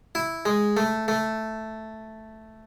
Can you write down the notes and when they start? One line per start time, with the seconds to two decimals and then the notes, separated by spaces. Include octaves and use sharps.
0.15 E4
0.45 G#3
0.77 A3
1.08 A3